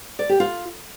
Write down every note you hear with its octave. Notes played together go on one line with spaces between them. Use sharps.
D5
G4
F4